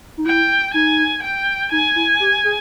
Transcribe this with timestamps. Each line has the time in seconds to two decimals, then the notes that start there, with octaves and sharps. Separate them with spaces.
0.17 D#4
0.26 E4 G5
0.74 D#4 G#5
1.23 G5
1.71 D#4 G#5
1.96 E4
2.20 G4
2.44 G#4